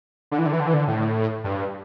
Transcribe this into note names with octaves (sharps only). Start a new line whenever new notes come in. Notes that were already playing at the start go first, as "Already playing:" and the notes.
D3
E3
D3
E3
D3
E3
D3
A2
G2